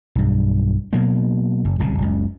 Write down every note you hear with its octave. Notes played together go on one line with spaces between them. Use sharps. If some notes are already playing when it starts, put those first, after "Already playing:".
B1 G2
B2 F#3 A#3
F#1
D1 C2 C#3
F#1 C#2